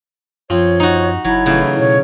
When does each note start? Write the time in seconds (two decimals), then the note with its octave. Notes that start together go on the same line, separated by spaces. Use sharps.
0.50 F#2 F3 C4 C#5
0.80 D#4 F#4
1.25 F#1 F#3 E4
1.46 A2 C#3 E3
1.80 B2 C#5